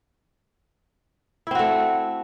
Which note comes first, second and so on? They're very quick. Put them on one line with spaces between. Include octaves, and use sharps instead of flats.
E4 C4 F#4 A3